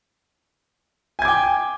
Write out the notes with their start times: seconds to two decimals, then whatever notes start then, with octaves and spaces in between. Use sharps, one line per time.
1.19 G#5
1.22 G#6
1.25 D6
1.28 G5